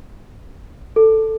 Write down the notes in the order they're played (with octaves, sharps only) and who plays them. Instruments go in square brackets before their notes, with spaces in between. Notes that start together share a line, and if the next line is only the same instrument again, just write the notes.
[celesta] A4